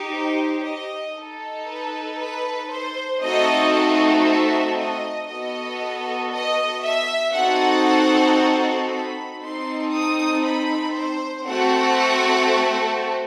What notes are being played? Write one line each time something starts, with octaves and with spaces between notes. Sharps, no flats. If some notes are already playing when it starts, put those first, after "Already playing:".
Already playing: D#4 G4
C5
D#5
D#4 A4
B4
B4
C5
A3 C4 D#4 F#4 A4 D#5
D#5
E5
D#5
B3 F#4 A4 D#5
D#5
E5
C4 D#4 F#4 A4 F#5
B5
C4 D#4 A4 C6
D#6
B5
C5
A3 C4 F#4 A4 F#5